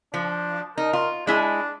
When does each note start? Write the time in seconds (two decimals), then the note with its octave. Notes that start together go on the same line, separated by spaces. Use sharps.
0.14 F3 D4
0.78 D#4 A#4
0.93 F4
1.27 G#3 D4 E4 G#5